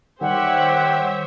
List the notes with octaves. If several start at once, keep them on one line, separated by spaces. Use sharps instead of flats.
D#3 G3 G4 C5 C#5 E5 F#5